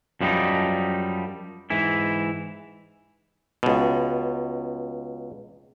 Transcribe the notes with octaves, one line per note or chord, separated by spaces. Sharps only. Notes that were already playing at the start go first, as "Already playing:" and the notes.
F#2 F3 G3 D4 D#4
G#2 E3 E4
C#2 B2